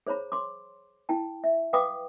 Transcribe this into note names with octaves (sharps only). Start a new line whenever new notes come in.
G#4 C5 C#5 A#5 B5
C6 D6
E4 G5 A5
E5
B4 F5 G5 B5 D6 D#6